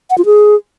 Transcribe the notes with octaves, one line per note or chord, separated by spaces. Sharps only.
F#5
F4
G#4